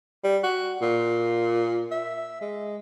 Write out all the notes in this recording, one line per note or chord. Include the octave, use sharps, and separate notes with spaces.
G3
F#4
A#2
E5
G#3